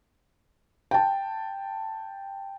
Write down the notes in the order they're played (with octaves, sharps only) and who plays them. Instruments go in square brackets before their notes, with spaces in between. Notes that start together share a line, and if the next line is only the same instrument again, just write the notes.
[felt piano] G5 A5